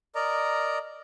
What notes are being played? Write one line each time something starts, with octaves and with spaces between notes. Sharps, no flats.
A#4 D5 D#5 A#5